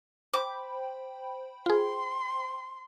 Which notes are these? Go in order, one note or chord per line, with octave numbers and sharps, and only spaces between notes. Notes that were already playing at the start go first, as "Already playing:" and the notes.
C5 G5 B5 D6
F4 G#4 C6